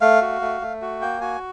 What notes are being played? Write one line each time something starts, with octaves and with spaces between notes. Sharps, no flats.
A3 F5
F#4
A3
A3
F#4
A#3 G5
F#4 G#5